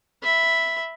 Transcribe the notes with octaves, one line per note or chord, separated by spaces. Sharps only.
E5 B5